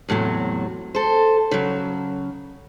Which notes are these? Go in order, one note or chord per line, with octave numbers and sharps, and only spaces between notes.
E2 A2 C3 F#3
A4 C5
C#3 F#3